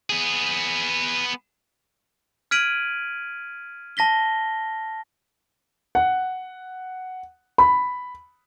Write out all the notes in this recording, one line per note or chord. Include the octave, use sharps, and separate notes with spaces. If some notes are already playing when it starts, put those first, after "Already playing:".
B3 G#4
F6 G#6 B6 D7 D#7 F#7
A5 A#6 B6 G7
F#5
B5